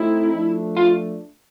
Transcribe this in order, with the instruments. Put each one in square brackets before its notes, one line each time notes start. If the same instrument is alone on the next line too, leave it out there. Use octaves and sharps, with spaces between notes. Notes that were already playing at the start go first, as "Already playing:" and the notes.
Already playing: [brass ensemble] A3 C4 D#4 [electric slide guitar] E4
[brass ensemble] F3 A3 D4
[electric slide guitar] F4